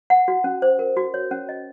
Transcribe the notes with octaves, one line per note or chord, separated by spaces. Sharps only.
F#5
F#4
C#4
C5
A#4
F#4
C#5
C#4
D#5